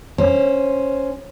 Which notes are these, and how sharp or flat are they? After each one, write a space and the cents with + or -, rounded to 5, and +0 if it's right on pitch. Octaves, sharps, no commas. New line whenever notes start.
C#4 +0 C5 +0